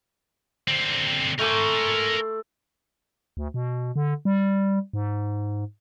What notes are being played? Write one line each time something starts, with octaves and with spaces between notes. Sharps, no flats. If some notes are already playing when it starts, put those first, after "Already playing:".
D3 C4
A3 A#4 G#5 C6 D6
D2
B2
D3
G3
G#2